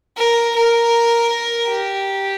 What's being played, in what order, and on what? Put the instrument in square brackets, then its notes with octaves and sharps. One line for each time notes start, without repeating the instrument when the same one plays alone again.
[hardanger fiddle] A#4
A#4
G4